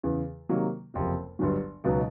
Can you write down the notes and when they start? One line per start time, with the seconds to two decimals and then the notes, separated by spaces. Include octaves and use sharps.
0.03 E2 C#3 E3
0.49 C3 D#3 F#3 A#3
0.94 F#1 F2 C3
1.39 G1 G2 D3 F#3
1.84 C#2 B2 F#3 B3 D#4